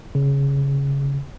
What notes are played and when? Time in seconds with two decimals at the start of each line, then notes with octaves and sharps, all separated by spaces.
0.15 C#3